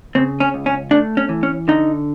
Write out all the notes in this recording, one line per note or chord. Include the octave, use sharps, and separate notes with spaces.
C#3 C4
C#4
C#2
C#4
A3 D4
C#4
E3
C#4
D3 D#4